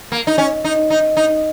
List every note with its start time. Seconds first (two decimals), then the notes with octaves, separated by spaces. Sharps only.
0.12 A#3
0.27 D#4
0.38 C#4
0.64 D#4
0.90 D#4
1.17 D#4